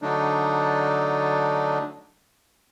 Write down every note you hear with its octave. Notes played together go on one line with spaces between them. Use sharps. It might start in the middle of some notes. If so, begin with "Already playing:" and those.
D3 F#3 A3 D4 D#4